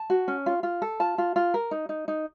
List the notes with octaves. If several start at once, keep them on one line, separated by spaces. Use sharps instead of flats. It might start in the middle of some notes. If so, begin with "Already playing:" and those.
Already playing: A5
F#4
C#4
F4
F4
A4
F4 A5
F4
F4
A#4
D#4
D#4
D#4